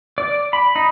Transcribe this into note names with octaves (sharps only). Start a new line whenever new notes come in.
D5
B5
D#4